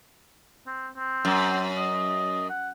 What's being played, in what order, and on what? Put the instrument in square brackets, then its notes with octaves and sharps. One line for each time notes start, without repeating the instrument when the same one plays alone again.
[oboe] C4
C4
[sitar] F#2
[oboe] D#5
F#5